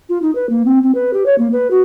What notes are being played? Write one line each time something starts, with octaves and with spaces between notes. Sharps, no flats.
F4
D#4
B4
A#3
C4
C4
B4
G4
C#5
A#3
B4
F#4